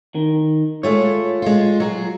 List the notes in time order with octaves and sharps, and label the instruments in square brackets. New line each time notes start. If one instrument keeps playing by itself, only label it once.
[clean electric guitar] D#3
[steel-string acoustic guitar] G#3 A3 F4 [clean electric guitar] C#5
[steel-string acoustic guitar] G#3 F4
F#3 G#4